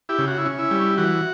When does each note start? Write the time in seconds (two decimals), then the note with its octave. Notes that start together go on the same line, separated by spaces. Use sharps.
0.09 E4 G4
0.18 C#3
0.27 F#4
0.38 E4
0.45 C#4
0.58 E4
0.71 G3
0.98 E3 F#4